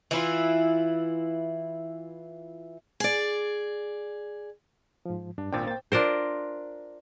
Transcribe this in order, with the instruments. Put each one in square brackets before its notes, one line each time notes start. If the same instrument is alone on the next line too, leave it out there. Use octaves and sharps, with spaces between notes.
[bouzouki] E3 E4 F4
[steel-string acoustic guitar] G#4 D5
[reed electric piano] G#2 F3
[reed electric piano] G2 [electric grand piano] D4
[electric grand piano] G#1 A#2 G5 [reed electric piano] D4 C5 A6
[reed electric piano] A#3 A6 [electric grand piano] C5 G5
[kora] D4 F4 A#4 C5